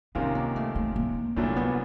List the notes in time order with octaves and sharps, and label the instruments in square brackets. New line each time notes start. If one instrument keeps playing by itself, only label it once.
[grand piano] C3 D#3 G#3 C#4 F4 [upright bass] B3
[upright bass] A#3
A3
A3
A#3
[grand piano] C2 A#2 F#3 A3 D4 [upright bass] A#3
[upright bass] B3